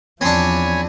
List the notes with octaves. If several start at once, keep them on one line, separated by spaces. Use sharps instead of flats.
E2 F3 C4 D4 C#5 G#5 B5